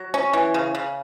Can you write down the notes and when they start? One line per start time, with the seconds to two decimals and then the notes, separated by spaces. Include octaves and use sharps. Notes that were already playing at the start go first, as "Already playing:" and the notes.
Already playing: F#3
0.14 C#4
0.33 E3
0.54 C#3
0.75 C#3